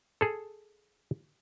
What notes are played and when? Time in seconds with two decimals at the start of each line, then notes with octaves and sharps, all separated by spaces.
0.21 G#4 A4